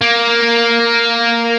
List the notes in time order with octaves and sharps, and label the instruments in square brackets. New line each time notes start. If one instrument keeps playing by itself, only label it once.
[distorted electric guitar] A#3